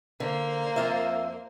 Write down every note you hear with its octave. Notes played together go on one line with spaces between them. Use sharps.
D3 A#3 C5
F2 F4 E5